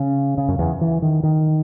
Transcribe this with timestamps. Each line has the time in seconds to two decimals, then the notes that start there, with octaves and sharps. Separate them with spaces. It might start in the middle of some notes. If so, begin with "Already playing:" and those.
Already playing: C#3
0.38 C#3
0.48 F#2
0.59 E2
0.81 E3
1.02 D#3
1.23 D#3